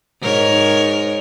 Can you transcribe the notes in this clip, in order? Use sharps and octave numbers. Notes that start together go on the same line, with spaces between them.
G#2 A#4 C#5